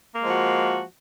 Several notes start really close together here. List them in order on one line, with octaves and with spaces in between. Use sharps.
A#3 G#3 F3 F#4